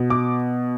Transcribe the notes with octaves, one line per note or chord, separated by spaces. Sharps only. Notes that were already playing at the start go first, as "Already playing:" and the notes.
Already playing: B2
D6